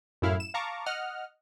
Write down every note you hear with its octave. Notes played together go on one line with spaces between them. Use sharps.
F#2 A2 E4 F5 F6
E7
F5 A5 A#5 C#6 D6
D#5 F#5 F6